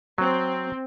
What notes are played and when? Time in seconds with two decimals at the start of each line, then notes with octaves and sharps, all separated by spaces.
0.18 F#3 C4